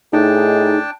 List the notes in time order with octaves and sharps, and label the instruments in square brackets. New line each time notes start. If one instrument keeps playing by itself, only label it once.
[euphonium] A2 [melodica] D4 G5 A5 [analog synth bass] D#4 [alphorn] G#4